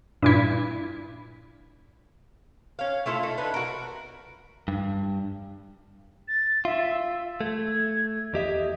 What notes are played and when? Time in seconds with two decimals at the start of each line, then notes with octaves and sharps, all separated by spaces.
0.22 G2 A#2 E4
2.79 C#4 F5
3.06 A3 E4 F4 A4
3.23 D#4 A4
3.38 D4 D#4 B4
3.54 F#4 A#4
4.68 G2
6.28 A6
6.65 F4 E5
6.90 E6
7.41 A3 G#6
8.34 E2 G4 D#5 E5